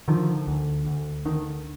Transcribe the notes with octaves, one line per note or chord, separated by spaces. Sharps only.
D3 D#3 F3
D2
D2
D3 D#3